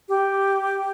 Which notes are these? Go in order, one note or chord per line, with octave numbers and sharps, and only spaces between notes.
G4